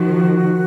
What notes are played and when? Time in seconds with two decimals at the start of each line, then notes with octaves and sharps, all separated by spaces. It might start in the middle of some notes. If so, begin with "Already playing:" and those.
Already playing: D#3 F3 F#4